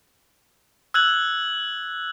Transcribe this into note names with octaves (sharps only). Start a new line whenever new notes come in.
E6 F#6 G#6 F#7